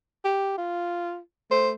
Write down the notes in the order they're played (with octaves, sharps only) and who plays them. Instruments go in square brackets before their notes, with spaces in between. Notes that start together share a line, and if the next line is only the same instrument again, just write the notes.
[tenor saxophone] G4
F4
[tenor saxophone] A3 [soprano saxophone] C5